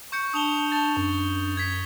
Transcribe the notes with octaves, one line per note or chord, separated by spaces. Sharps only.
C#6 G6 C#7
D4 A5 D#6 F7 G7
A5 A6 G7
F#2
G#6 B6